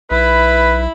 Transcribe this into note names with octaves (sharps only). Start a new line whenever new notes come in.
B1 E4 B4